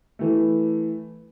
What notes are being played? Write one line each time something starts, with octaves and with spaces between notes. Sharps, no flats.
E3 A3